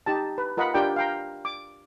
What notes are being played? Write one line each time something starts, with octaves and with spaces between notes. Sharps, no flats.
D#4 G4 A5
B4
F4 A#4 D#5 F#5 B5
D4 F4 G4 A#4 D5 G5
F5 G5 A#5
D6